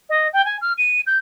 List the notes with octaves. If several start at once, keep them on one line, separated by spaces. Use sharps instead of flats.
D#5
G5
G#5
F6
D#7
G6